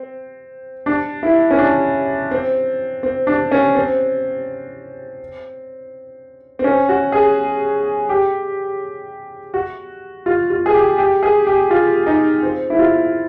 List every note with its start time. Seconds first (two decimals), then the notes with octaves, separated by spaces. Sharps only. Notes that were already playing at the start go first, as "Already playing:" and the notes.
Already playing: C4
0.86 D4
1.23 E4
1.51 C#4
1.58 D4
2.31 C4
3.03 C4
3.27 D4
3.51 C#4
3.75 C4
6.59 C4
6.64 C#4
6.89 F#4
7.12 G#4
8.09 G4
9.54 F#4
10.26 F4
10.50 F4
10.66 G#4
10.74 G4
10.98 G4
11.23 G#4
11.47 G4
11.71 F4
12.07 D#4
12.43 C4
12.70 E4
12.79 F4